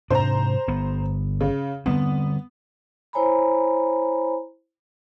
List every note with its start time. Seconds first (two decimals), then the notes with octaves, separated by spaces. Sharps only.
0.10 G#2 C3 D4 C5 A#5
0.68 G1 B3
1.41 C#3
1.86 D3 G3 B3 C4
3.13 E4 C5 C#5 G#5 A#5 B5